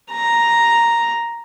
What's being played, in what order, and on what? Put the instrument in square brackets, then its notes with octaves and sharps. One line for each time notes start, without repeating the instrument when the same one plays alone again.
[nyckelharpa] A#5